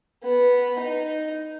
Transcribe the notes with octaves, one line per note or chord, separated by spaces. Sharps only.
B3
D#4